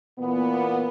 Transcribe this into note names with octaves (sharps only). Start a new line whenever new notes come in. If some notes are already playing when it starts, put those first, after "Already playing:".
A#2 E3 A#3 B3